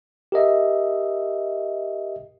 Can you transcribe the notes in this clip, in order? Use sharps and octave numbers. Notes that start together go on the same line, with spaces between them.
G4 A#4 D#5 E5